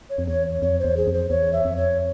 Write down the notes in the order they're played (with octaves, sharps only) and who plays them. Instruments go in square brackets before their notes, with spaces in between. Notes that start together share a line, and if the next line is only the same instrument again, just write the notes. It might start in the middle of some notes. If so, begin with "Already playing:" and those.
[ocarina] C#5
[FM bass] F2
[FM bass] E2 [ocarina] C#5
[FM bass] F2 [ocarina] C#5
[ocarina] C5
[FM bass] E2
[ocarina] G#4
[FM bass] F2
[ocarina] C5
[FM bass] E2 [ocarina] C#5
[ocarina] E5
[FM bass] F2
[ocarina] C#5